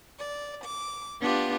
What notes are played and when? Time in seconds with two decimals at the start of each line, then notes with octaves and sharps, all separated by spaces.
0.20 D5
0.64 D6
1.20 B3 D4 F4 G4